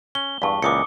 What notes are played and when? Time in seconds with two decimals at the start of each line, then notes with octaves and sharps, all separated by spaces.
0.15 C#4 G7
0.42 E2 G2 F5 A5 C#6
0.62 C#2 A#2 E3 D6 D#6 C#7